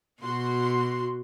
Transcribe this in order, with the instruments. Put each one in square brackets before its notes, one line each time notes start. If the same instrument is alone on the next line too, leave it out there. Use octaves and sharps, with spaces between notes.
[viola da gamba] B2 [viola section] F#4 C6